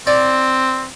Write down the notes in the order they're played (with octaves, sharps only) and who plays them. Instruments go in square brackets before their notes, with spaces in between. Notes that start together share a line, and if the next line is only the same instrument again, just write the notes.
[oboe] C4 [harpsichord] D5